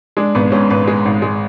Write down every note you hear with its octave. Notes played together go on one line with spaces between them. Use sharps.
G#3 D4
G#1 B3
G#2 C#4
G#1 B4
G#3
G#1
G#3